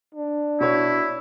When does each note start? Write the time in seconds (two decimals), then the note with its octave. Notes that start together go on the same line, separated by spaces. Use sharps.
0.15 D4
0.60 B2 E4 C#5